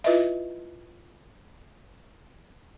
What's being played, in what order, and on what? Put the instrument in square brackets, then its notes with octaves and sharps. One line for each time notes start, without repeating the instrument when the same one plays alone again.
[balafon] E4 F4 B4 D#5 E5